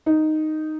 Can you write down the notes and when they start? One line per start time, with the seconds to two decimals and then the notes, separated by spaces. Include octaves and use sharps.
0.06 D#4